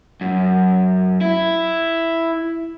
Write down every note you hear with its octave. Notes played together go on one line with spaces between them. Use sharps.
F#2
E4